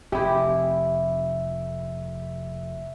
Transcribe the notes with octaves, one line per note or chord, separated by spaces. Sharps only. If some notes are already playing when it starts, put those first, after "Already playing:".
F1 G#3 C4 E4 G4 E5